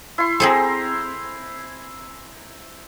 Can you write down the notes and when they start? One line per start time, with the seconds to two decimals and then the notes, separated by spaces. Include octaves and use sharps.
0.18 E4 C6
0.40 C4 G#4 A4 C5 G#5 A#5